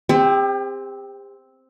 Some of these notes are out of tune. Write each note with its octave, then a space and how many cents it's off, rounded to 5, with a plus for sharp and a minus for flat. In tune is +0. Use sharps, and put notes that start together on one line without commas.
C4 +0 G4 +40